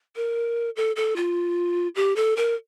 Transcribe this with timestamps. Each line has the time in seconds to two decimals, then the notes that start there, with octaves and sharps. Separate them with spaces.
0.16 A#4
0.76 A4
0.96 A4
1.16 F4
1.96 G4
2.16 A4
2.37 A#4